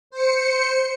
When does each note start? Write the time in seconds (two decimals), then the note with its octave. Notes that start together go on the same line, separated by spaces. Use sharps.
0.10 C5 C#7